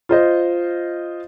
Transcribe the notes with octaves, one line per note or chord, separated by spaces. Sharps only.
F4 C5 D#5